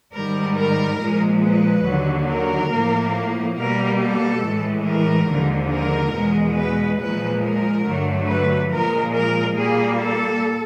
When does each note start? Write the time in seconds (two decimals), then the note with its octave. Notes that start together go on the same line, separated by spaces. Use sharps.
0.15 G#2 D#3 G3 A#4
0.58 A#4
1.01 A#2 F3 G#3
1.44 B4
1.86 D#2 D3 F#3
2.29 A#4
2.72 A2 F3 A#3
3.58 B2 G3 A#3 A#4
4.00 A4
4.43 A2 E3 G#3
4.87 A#4
5.29 D#2 D3 F3 G#3
5.72 A#4
6.14 E2 B2 G#3
6.57 B4
7.00 A#2 F3 G#3 B4
7.43 A#4
7.86 G2 D3 F#3 A3
8.28 B4
8.71 A#2 F3 G#3 A#4
9.14 A#4
9.56 A#2 G3 A#3 G#4
10.00 A4